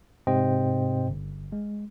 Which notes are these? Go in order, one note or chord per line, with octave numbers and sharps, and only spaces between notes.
G#2 C3 C4 C5 D#5 G5
G1
G#3